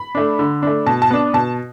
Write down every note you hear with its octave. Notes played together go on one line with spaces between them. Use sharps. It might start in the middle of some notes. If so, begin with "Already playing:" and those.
Already playing: B5
A3 D4
D3
A3 D4
B2 A5
A5
B3 D4
B2 A5